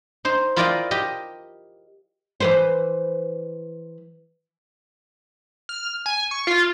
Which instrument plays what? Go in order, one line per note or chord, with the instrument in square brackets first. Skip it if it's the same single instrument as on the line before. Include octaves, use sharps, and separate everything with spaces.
[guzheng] D#4 C5
E4 F4 A#4 D5 D#5 G5
G4 D#5
[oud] E3 B4 C5
[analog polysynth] F6
G#5
C#6
F4